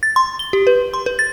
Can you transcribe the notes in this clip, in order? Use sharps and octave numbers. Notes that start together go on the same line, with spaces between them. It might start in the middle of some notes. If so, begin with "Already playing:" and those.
A6
C6
G7
G4
B4
C6
B4
A6